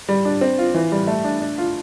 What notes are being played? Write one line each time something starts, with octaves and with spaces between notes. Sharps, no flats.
G3
D4
C4
F4
E3
G3
A3
D4
D4
F4